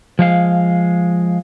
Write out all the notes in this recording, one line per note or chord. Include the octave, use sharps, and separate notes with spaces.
F3 G#3 F5